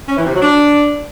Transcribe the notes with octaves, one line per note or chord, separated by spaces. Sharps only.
C#4
E3
C3
F#3
D4